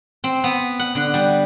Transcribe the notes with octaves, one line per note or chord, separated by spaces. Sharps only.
C4
B3
F#5
D3
G3